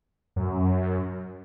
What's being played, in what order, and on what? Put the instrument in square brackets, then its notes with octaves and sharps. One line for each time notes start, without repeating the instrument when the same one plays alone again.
[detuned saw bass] F#2